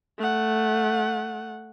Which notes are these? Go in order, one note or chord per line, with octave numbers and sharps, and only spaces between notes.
A3 F#5